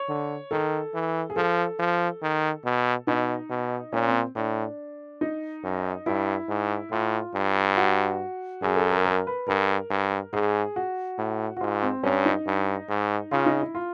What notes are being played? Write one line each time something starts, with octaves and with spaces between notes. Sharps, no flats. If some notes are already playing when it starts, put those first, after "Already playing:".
Already playing: C#5
D3
D#3 A4
E3
G#4
F3 A4
F3
D#3
B2
B2 D#4
B2
A#2 C#4
C4
A2 D4
D#4
F#2
G2 E4
G#2
A2 F4
G2
F#4
F#2 G#4
A4
A#4
A#4
B4
G2 A#4
G2
G#2 G#4
F#4
A2
F#4
G#2 F4
C4
G2 C#4
D#4
G2
G#2
C#3 F4
D#4
E4
F4